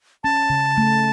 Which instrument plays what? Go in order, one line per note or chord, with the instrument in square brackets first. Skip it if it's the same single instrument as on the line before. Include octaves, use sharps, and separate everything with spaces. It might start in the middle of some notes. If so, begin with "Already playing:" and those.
[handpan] C#4 [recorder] A5
[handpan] C#3
A3